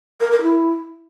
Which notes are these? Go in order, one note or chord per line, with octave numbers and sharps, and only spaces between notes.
A#4
A#4
E4